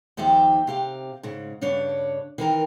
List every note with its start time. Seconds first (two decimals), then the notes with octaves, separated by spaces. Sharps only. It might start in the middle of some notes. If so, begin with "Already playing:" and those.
0.17 D#2 D#3 F3 G4 E5
0.67 C3 G4 F5
1.23 G#2 C#3
1.61 G2 C#3 D4 C#5
2.38 D#3 E3 A#4